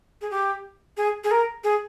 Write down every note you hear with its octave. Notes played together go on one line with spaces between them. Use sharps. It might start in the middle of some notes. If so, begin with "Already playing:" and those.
G#4
G4
G#4
G#4
A#4
G#4